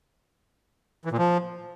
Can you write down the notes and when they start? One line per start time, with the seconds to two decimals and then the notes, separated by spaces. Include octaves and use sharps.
1.05 E3
1.12 A#2
1.18 F3